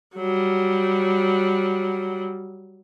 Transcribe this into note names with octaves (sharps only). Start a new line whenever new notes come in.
F#3 G3